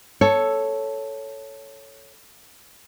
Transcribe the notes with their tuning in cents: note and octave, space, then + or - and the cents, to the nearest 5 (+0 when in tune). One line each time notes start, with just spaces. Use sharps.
A4 +0 C#5 +0